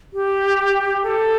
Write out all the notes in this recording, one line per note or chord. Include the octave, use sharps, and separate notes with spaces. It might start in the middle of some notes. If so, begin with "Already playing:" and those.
G4
A4